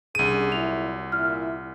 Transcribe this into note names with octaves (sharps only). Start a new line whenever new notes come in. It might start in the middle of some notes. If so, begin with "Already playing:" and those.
C2 C#4 D4 G#4 D#7
A#2 F#3 E4 F7
A#2 E4 F6